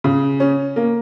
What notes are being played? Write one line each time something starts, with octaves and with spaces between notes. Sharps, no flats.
C#3
C#4
A#3